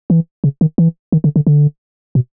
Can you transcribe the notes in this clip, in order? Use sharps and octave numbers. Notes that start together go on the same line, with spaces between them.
E3
C#3
D#3
E3
D#3
D3
D3
D3
B2